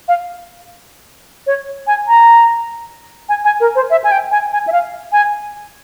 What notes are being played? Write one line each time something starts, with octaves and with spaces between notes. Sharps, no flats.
F5
C#5
G#5
A#5
G#5
G#5
A#4
C5
E5
G#5
G5
G#5
G#5
E5
F5
G#5